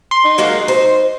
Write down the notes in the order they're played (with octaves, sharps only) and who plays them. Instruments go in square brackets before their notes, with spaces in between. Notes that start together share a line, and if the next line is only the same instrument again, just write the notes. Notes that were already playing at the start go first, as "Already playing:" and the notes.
[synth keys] C6
[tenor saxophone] D#4
[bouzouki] F#3 G#3 A#3
C5